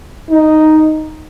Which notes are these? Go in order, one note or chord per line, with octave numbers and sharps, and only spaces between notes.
D#4